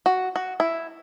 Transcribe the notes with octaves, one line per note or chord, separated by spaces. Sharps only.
F#4
F#4
E4